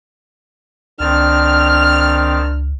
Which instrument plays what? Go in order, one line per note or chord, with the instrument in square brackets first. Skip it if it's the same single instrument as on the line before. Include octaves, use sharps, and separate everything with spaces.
[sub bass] C#2 [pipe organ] D#3 C4 A5 [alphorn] D4 [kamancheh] F6